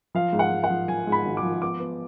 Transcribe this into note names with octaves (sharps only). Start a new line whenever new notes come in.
F3 F5
G#2
F#5
G#2
F#5
F3
F3 G#5
G#2
B5
G#1
D6
F3
B3 D6
B3